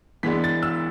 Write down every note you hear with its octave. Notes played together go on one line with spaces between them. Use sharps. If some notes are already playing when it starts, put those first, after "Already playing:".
E3 G#3 B3 D4 B6
A6
E6